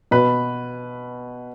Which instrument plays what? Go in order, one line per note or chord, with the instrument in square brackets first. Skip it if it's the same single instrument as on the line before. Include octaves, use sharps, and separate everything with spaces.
[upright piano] B2 B4 B5